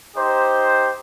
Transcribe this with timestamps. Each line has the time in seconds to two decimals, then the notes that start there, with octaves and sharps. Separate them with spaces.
0.17 D#4 G4 C5